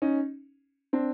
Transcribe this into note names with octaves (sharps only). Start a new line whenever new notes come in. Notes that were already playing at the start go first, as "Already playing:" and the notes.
C#4 D#4
C4 D4